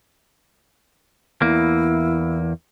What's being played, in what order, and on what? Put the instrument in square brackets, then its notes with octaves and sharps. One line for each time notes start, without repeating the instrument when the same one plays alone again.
[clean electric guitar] E2 A#3 [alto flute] E4